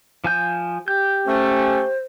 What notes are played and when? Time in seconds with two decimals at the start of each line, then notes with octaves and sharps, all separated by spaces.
0.24 F3 G#5 G6
0.88 G4 G6
1.26 A3 C#4 C5